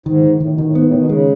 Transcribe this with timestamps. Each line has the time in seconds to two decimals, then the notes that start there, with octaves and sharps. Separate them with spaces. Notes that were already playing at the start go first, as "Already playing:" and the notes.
0.06 G#2 D#3
0.24 D#3
0.40 A2 D#3
0.53 B2
0.58 D#3
0.64 A2
0.75 G#2 B3
0.86 A2
0.91 D#3
0.98 B2
1.09 C#3 G#3